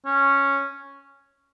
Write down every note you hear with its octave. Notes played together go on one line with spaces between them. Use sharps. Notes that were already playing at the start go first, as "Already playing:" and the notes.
C#4